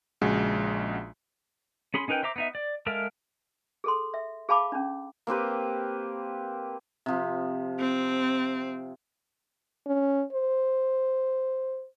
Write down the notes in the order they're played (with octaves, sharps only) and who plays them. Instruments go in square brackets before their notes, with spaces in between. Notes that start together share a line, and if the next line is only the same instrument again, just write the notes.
[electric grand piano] A#1 C#3 G#3 F#4
[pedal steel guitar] C#4 G#4 B5 C6
C#4 D#4 A#4 B4 G5
C5 E5 A#5 D6
B3 D#4 E5
D5
G#3 A4 A#4 E5 F5
[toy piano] G#4 A4 C6
E5
G#4 F5 A5 B5 D6
C#4 D4
[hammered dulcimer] A#3 C4 G4 B4
C3 F3
[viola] C4
[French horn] C#4
C5